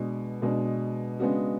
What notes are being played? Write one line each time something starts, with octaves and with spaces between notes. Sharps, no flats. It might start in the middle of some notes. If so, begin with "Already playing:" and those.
Already playing: B2 G#3 D4
B2 G#3 D4
C#3 G#3 B3 D4 F#4